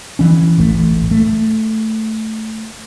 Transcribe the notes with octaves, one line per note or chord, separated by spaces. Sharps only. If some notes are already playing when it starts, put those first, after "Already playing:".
E3 C#4
D#1 A1 A3
A3